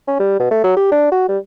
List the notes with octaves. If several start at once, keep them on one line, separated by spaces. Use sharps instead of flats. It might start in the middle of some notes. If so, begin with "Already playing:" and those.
C#4
G3
B2
A3
F#3
G4
D4
F#4
G3